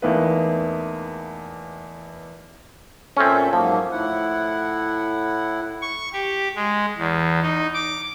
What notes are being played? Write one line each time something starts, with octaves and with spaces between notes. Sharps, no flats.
E2 A3 A#3 D#4 B4
A#2 C4 C#4 A4 E5
G#2 F3 F#3 A#3
A2 E4 F#5
C#6
G4
G#3
E2
D#4
D6